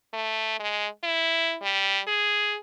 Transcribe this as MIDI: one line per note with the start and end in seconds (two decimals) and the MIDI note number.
0.13 0.59 57
0.59 0.88 56
1.03 1.56 64
1.62 2.00 55
2.07 2.58 68